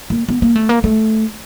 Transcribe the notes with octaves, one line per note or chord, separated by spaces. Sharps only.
A#3
B3
A#3
A3
A#3
A3